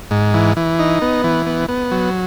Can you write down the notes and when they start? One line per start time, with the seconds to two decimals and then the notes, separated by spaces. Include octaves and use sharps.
0.11 G#2
0.34 E3
0.57 E3
0.79 D#4
1.02 B3
1.24 E3
1.46 B3
1.68 B3
1.91 F#3